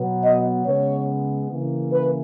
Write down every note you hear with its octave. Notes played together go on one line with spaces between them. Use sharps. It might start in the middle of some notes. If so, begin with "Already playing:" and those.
Already playing: B2 F#3 B3
D#5
C#3 G#3 B3 C#5
C#3 E3 A#3
B4